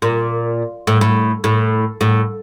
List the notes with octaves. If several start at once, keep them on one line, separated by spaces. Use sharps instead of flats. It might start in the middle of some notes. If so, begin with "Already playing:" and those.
A#2
A2
A2
A2
A2